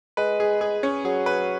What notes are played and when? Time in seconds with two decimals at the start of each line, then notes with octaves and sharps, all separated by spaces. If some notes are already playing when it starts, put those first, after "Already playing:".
0.17 G#3 B4
0.40 G#4
0.61 G#4
0.83 C#4
1.05 F#3 G#4
1.26 B4